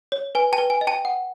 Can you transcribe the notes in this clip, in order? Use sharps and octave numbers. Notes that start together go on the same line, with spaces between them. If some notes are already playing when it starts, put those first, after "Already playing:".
C#5
B4 G#5
G5 A5
B4
G#5
D#5
G5 A5
F#5